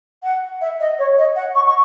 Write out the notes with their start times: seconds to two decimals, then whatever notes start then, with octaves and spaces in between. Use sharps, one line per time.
0.23 F#5
0.61 E5
0.80 D#5
0.99 C#5
1.18 D#5
1.36 F#5
1.55 C#6
1.66 C#6